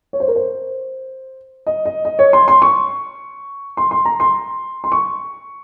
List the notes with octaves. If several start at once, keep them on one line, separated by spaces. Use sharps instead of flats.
C#5
C5
A#4
C5
D#5
D#5
D#5
C#5
C6
C6
C#6
C6
C6
A#5
C6
C6
C#6